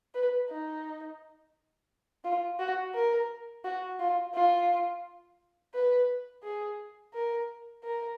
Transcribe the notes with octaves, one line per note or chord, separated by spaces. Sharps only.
B4
D#4
F4
F#4
A#4
F#4
F4
F4
B4
G#4
A#4
A#4